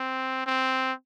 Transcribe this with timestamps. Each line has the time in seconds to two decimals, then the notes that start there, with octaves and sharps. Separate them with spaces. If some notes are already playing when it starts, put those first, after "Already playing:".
Already playing: C4
0.46 C4